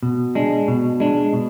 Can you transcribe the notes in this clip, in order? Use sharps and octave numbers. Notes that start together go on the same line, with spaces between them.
B2
G#3 D4
B2
G#3 D4
B2